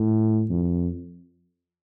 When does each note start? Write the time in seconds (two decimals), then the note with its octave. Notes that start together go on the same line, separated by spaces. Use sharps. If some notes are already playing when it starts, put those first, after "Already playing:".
Already playing: A2
0.49 F2